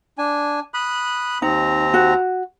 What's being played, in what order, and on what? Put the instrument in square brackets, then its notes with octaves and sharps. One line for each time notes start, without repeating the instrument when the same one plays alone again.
[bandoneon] D4 G#5
B5 D#6 F#6
[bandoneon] D#2 C4 A#5 [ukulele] D#4
[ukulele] F#4